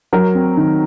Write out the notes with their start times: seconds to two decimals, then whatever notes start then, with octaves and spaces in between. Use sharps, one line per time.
0.13 F#3 A#4
0.35 C4
0.57 D#3